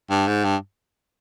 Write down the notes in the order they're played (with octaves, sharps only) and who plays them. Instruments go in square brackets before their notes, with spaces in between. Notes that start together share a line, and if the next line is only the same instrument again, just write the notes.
[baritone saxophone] G2
G#2
G2